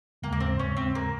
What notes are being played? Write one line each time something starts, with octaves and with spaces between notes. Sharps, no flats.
D#2 C#3 G#3 A#3
A#3
C4
C#4
C4
A#3